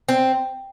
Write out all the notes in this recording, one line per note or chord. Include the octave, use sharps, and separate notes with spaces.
C4